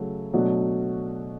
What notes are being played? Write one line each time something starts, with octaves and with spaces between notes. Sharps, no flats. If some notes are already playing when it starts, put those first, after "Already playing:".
Already playing: C#3 F#3 A3
B2 F#3 A3 D4 F#4